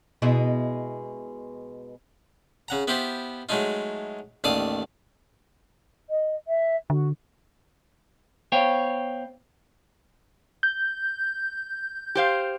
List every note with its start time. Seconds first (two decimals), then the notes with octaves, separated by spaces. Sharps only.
0.22 B2 G#3 E4
2.68 C#3 F#5 A#5
2.88 B3 E4 F4 G4 C5
3.49 F#3 G#3 A3 D#4 F4
4.44 A1 D#2 A4 D5 F5 D#6
6.09 D#5
6.47 E5
6.90 D3 F#4
8.52 B3 C5 C#5 F5 G5
10.63 G6
12.15 G4 C5 F5